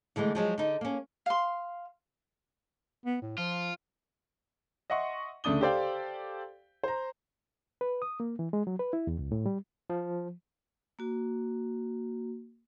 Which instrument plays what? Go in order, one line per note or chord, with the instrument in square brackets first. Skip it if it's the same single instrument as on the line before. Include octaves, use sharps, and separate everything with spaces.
[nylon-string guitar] D3 E3 G#3 A3
F3 F#3 G#3
D3 D#4
A#3 C#4
[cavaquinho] F5 C6
[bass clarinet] B3
A2
[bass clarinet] F3 [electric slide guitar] F4
[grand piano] D#5 E5 F#5 C6 C#6
D2 C#3 A3 D4 D#6 G7
G4 A4 C5 D5 F5 G5
C5 A#5
[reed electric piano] B4
D#6
A#3
E3
G#3
F#3
B4
E4
E2
C#2
A2
G3
[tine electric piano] F3
[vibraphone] A#3 F#4